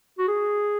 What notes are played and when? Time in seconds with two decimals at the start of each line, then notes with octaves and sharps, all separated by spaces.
0.19 F#4
0.28 G#4